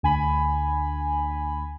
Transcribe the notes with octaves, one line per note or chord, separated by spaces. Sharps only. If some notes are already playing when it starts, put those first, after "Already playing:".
D2 G#5 B5